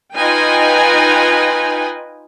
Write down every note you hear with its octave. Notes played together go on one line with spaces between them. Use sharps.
D#4 F4 B4 D#5 G5 G#5